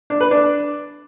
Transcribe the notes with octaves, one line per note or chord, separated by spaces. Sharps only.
D4
B4
D4